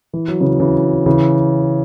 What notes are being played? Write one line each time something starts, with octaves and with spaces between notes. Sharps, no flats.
E3
F#3
C#3 E3
C#3 E3
C#3 E3